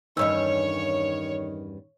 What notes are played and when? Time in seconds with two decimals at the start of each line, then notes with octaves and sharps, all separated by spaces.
0.17 E2 G2 D#3 C#4 C#5 D#5 E6